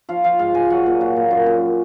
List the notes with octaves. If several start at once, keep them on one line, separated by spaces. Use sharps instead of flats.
F3 F5
F3 F5
G#2 F5
G#2 G#5
F#3 F#5
A#2
F#3 F5
A#2
F#2
F#2